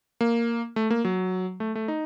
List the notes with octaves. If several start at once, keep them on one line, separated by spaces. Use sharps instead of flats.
A#3
A3
A#3
F#3
A3
A3
D#4